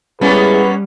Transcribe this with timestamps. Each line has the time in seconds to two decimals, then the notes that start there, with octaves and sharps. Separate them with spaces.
0.21 G3 G#3 A#3 B3 C#4 E4 G#4 B4